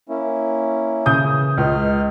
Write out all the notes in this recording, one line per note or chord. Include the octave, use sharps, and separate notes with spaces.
A#3 C#4 E4
C#3 D#6 G6
E3
C#2 D#5 F6